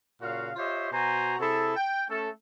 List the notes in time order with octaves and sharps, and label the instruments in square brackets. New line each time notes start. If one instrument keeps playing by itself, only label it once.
[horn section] A#2 C#3 F#4 F5
F4 G4 C5 C#5 D#5 E5
B2 F#4 C5 G#5 A#5
C3 E4 G#4 A4
G5
A3 C#4 A4